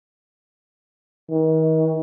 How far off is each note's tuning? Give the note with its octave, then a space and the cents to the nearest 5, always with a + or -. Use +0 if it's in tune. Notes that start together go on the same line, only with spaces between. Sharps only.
D#3 +40